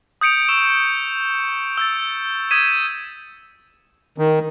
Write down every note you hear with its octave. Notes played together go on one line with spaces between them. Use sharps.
D#6 G6 C#7 D7 F7
C#6 D#6 E6 E7 F7
E6 G6 A6
D#6 G6 G#6 B6 D#7 E7
D#3